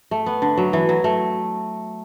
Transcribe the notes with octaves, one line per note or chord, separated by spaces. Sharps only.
A3
B3
D3
F#3
E3
F#3
A3